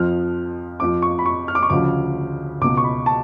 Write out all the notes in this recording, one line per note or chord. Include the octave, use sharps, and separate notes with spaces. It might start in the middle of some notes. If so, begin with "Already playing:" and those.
Already playing: F2 F3 F6
F2 F3 D6
C#6
B5
C#6
F6
D6
C#6
D2 C#3 F3 D6
C#2 B2 D6
C#6
B5
A5